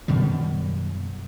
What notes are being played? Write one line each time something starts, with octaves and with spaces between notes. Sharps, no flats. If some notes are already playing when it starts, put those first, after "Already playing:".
F#2 B2 D#3 G3